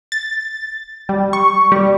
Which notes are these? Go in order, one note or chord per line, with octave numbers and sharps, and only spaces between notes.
A6
G3
C#6
G3